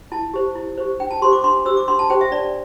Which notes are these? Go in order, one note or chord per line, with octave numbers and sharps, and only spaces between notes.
E4 A5
G4 C5
E4
G4 C5
D4 G5
A5
G4 C5 C6
D6
D4 C6
G4 C5 E6
D6
D4 C6
A5
G4 C5 G5
E5
D4 D5